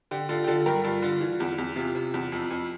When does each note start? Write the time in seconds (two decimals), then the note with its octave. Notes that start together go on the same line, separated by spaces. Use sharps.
0.11 D3 G4
0.29 D3 F4 A4
0.44 G4
0.47 D3 F4 A4
0.66 G2 G4 A#4
0.84 G2 F4 A4
1.02 D3 F4
1.21 E3
1.40 E2
1.58 E2
1.76 C3 F4
1.95 C3
2.14 E2
2.32 F2
2.51 F2